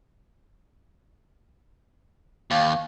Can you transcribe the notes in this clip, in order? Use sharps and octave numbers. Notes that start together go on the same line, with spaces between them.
D#2 F5